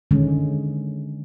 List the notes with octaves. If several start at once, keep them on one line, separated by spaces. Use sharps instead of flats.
D3 D#3 G#3 C#4